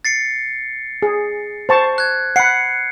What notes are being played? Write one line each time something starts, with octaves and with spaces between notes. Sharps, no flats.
A6 C7 C#7
G#4
C5 A5 C#6
F#6 G#6
F#5 B5 C7 C#7